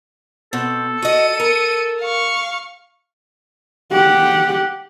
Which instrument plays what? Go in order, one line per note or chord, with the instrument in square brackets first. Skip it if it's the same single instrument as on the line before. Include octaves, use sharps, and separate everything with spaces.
[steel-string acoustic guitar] B2 C4 [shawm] A4
[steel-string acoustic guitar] F#4 D#5 [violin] C#7 D#7
[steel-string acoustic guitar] A#4
[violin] F5 C#6
[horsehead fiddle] G4 F#5